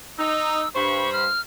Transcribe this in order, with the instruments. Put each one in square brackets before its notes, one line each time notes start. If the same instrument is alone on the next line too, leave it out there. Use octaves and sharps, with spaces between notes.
[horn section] D#4 [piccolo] E6
[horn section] G2 C5 B5 [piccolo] C#6
[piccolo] F6